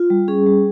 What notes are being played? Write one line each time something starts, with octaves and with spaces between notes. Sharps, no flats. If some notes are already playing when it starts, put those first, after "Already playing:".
Already playing: F4
G3
C#4 G#4
G3